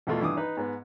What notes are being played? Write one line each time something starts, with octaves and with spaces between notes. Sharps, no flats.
E2 B2 A3 F4
G2 E3 D6 D#6
D#4 B4
G#2 B3